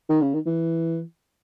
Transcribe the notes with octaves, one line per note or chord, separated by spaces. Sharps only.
D#3
C#3
D#3
E3